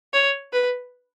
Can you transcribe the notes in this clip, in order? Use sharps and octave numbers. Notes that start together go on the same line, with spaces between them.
C#5
B4